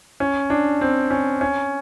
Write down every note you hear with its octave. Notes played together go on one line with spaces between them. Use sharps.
C#4
D4
C4
C#4
C#4